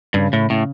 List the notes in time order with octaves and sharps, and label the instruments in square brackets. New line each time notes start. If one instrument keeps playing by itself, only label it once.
[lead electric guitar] G2 [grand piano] C#3
[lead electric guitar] A2
[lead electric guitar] A2 [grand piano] C#4